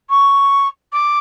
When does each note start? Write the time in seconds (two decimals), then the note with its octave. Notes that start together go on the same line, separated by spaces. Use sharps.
0.09 C#6
0.92 D6